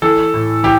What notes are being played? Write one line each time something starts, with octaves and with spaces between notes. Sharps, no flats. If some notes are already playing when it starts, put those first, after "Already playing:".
E3 A4
A2
E3 G4